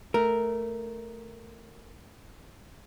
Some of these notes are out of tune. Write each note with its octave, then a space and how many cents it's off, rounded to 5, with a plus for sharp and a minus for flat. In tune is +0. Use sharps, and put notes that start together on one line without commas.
A3 +0 A#4 +0